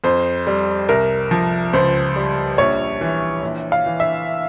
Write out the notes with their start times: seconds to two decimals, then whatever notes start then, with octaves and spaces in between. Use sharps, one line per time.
0.04 F2 C5
0.47 G3
0.89 C2 A#4
1.31 F3
1.73 C#2 C5
2.16 G3
2.58 A#1 C#5
3.01 E3
3.43 A#1
3.72 F5
3.86 E3
4.00 E5